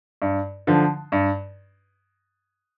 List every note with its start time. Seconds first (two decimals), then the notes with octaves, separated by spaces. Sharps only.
0.22 G2
0.67 D3 F3
1.12 G2